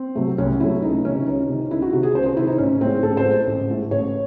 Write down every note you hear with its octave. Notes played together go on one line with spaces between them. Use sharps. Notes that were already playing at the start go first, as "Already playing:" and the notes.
Already playing: C4
C3 F#3 A3
C2 C#4
C3 F#3 A3 E4
C#2 D#4
C3 D#3 C#4
C#2 D#4
C3 D#3
C#2 E4
F#4
C3 D#3 F#4
G#4
C#2 C5
C5
C3 D#3 E4
D#4
A1 C#4
A2 G#3 C4
A1 A4
C5
A2 G#3
A1
A2 G#3
A1 C#5